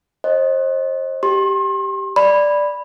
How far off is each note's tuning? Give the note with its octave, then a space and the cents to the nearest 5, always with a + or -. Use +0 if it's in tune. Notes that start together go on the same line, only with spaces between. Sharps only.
C5 +35 D#5 +0
G4 -5 C6 +35
D5 +0 B5 +0